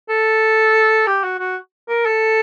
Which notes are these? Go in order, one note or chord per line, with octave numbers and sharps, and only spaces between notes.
A4
G4
F#4
F#4
A#4
A4